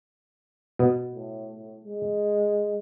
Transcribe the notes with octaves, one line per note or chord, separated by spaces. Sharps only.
B2 B3
A2
A2
G#3